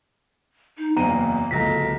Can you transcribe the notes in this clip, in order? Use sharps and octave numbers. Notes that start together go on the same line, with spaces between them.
D#4
F#1 E2 A#3 A#5 D#7
D1 C#2 A4 A#5 A#6 B6